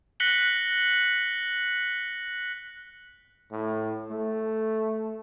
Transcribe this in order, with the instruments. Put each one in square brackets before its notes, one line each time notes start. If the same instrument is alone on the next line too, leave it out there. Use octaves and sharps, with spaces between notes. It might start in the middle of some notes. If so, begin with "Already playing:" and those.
[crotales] F#6 A#6 B6 C#7 F#7 G7
[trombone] A2
A3